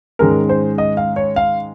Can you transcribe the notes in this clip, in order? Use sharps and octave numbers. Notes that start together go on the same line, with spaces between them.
G#2 D#3 G#3 C#4 A#4
C5
D#5
F5
C#5
F5